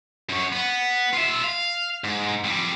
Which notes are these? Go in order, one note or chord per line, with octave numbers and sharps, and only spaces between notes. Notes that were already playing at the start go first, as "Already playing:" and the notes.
F#2 C#5
B3
F4 E5
F5
G#2
F2 G3